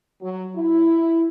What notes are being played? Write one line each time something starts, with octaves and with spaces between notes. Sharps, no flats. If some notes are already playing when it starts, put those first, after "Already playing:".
F#3
E4